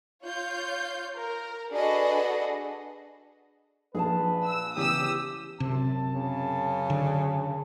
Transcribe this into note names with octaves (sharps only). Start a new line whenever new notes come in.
F4 C#5 G6
A#4
D4 F#4 G#4 A4 B4 D#5
A#1 G#4 B4 F5 A5
E6
C#3 E3 B3 G4 D#6 E6
F#2 C3 A5
C#3
D3